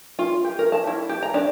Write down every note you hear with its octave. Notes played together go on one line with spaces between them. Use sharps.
F4
G4
A#4
A5
E4
G4
A#5
D4